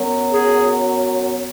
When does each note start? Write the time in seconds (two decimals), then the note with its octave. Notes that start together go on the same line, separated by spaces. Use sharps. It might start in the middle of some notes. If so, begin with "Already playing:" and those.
Already playing: F#2 F#3 B3
0.33 G#4